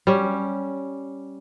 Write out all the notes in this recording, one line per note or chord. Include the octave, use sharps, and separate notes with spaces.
G3 C#4